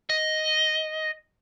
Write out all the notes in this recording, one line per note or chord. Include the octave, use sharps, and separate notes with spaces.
D#5